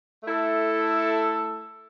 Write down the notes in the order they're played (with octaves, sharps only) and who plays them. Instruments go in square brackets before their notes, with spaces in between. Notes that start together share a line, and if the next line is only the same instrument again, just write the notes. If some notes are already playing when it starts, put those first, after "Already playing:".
[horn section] A3 E4 A4